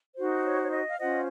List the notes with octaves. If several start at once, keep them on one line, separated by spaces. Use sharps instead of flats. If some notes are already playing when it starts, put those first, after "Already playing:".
D#4 F#4 C5
C#5
C#5
D#5
F5
C#4 F4 C5 D#5 F#5